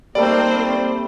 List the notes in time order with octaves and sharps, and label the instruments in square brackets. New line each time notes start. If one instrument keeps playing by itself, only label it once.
[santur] G3 A3 D#4 [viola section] A#3 C4 C5 [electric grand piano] D5